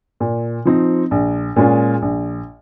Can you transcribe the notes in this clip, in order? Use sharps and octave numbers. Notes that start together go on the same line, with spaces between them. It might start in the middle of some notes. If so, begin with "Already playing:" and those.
A#2
F3 C4 D#4
A#1
A#2 G#3 C#4 F4
A#1